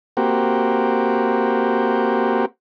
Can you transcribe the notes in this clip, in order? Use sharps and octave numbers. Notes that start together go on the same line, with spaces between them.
A#3 C4 F#4 G4